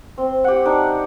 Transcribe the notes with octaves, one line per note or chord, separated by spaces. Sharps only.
C4
G4 F#5
D4 D#4 D5